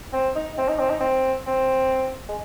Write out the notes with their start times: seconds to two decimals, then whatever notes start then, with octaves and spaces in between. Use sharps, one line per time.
0.13 C4
0.35 D#4
0.58 C4
0.68 D#4
0.79 C4
0.90 D#4
1.00 C4
1.47 C4
2.29 G#3